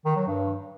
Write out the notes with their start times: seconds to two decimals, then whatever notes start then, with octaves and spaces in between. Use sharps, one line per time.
0.05 D#3
0.16 F#3
0.27 G2